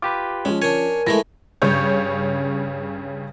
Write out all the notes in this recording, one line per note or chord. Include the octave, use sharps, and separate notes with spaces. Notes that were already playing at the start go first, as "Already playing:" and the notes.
F4 G4 B4 D6
F3 G#3 C#4
D4 A#4 C#5 G#5
E3 G#3 A3 E4 A#6
G2 C#3 C#4 C#5 G6